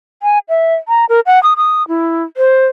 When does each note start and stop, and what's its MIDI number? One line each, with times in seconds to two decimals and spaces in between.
0.23 0.39 80
0.49 0.75 76
0.88 1.05 82
1.09 1.20 70
1.26 1.42 78
1.43 1.54 87
1.57 1.86 87
1.88 2.23 64
2.37 2.66 72